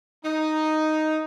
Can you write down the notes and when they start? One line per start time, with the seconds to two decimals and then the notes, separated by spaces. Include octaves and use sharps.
0.24 D#4